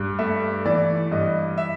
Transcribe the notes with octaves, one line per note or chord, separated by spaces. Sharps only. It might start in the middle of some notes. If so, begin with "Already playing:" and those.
Already playing: G2
A3 E5
E3 D5
G2 D#5
E5